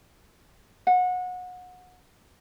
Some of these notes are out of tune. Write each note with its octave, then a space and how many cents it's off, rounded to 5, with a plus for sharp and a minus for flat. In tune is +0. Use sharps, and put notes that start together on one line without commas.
F#5 -25